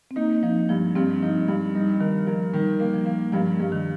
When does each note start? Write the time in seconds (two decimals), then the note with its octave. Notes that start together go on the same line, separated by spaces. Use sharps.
0.11 C4
0.16 A#3 D#4
0.43 F3 D#4
0.69 G2 F3
0.96 G2 C4
1.22 F3 D#4
1.48 G2
1.75 G3 D#4
2.00 D#3 A#4
2.27 F3 A#4
2.53 D#3 G3
2.79 A#3
2.93 F3
3.05 A#3
3.32 G2 F3
3.59 G2
3.72 D#3